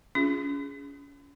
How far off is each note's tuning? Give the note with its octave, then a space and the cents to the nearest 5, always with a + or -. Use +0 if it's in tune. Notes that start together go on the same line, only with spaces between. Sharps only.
C#4 +30 F4 +0 G#4 +0